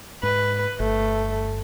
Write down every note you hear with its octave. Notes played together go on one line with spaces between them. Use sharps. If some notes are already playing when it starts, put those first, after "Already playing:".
G#2 B4
G1 A3